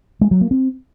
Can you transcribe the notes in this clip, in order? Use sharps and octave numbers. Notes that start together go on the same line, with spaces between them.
G#3
F#3
A#3
C4